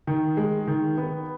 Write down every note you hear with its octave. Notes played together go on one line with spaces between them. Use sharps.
D#3
G#3
D#3
B3